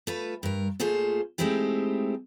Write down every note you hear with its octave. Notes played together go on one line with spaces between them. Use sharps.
A3 F4 B4
G2 A#4
A#2 A3 F4 G#4 C5
G#3 A3 C4 D#4 E4 G4